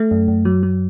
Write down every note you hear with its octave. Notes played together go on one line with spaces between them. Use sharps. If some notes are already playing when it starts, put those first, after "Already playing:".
Already playing: A3
F#2
F#2
F#3
F#3